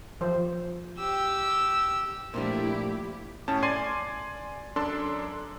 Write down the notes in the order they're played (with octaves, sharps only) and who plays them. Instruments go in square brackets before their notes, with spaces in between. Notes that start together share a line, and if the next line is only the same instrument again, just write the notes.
[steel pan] F3 C5
[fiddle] G4 E6
[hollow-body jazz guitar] A#2 F3 D4 [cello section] A3 E4 [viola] G4
[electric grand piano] A2 C#4 A5
D5 G#5 C6 G#6 C7 D#7
F#2 D4 A4 A5 C6